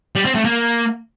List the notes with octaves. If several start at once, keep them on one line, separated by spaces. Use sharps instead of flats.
G3
C4
A3
A#3